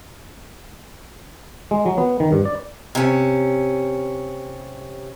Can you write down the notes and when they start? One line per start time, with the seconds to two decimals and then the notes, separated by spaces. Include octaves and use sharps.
1.71 G#3
1.86 F#3
1.98 B3
2.20 D#3
2.32 G2
2.45 D5
2.95 C3 C#4